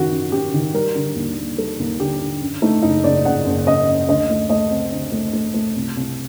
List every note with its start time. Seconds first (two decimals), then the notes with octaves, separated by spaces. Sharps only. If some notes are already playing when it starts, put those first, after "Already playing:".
Already playing: F#2 D#3 F#4
0.11 F#2
0.32 F#2 G4
0.54 D#3
0.74 G3 A#4
0.95 D3
1.16 D#2
1.37 A#3
1.58 G3 A4
1.79 D#2
2.00 D3 G4
2.20 D3
2.42 F#2
2.62 A3 D#4
2.82 F#1 D#4
3.04 F#1 D5
3.25 F#1 F#5
3.46 F#1
3.66 F#2 D#5
3.88 F#2
4.08 D2 D#5
4.30 A3
4.50 A3 D#5
4.71 C4
4.92 D3
5.12 A3
5.33 A3
5.54 A3
5.76 C2
5.97 C2